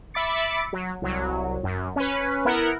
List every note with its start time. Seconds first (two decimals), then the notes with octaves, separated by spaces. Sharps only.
0.14 E5 B5 D6 A6 C#7
0.73 F#3
1.02 C2 F#3
1.63 F#2
1.96 C#4 B4
2.45 B3 E4 A#4 F#5